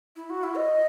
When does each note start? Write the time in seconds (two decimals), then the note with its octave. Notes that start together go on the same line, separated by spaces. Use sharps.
0.16 E4
0.30 F#4
0.43 E4
0.57 D#5